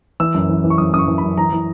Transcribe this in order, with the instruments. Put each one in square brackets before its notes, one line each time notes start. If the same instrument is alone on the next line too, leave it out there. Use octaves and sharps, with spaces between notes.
[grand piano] E3 E6
F#2
E3
E3
C#6
F#2 D#6
F#2 D#6
C#6
E3
F#2 B5
E3 A#5
E3